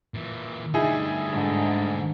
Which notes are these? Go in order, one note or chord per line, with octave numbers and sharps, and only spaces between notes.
A#2 E3
D2 G3 D#4 E4 G#4
G#2 D3